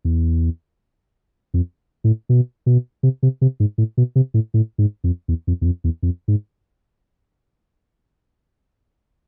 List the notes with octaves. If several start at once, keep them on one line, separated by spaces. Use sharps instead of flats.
E2
F2
A2
B2
B2
C3
C3
C3
G#2
A2
B2
C3
A2
A2
G#2
F2
E2
F2
E2
F2
E2
F2
G#2